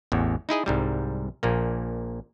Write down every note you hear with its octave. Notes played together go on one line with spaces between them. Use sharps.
A1 E2
D#4 E4 G#4 D#5
C2 G#2 G3
A#1 A#2 A#3